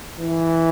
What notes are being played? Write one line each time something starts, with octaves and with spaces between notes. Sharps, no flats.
E3